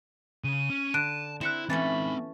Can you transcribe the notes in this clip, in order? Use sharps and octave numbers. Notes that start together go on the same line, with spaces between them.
C#3 D#7
C#4
D3 A5 F#6 D7
C4 E4 F#6 C#7 E7
E3 A3 C4 C#4 D#4 B5 A6